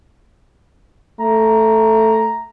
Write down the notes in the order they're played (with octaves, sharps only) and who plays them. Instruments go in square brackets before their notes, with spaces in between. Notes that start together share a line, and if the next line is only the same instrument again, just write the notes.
[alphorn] A3 [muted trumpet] A#5